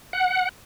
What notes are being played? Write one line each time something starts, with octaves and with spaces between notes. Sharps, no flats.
F#5